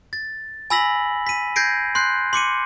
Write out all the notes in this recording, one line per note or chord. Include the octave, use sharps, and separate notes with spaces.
A6
G#5 B5 E6 A#6 B6 F#7
B6 D#7
G6 G#6 A#6 C7 D7
C6 F#6 G6 C7
C6 D6 C#7 D#7